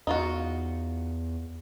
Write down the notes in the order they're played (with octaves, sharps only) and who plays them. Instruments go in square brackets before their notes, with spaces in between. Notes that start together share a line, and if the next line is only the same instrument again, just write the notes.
[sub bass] E2 [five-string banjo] D#4 F4 F#4